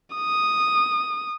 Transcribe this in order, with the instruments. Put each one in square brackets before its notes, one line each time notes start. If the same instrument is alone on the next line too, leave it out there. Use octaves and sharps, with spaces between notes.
[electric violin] D#6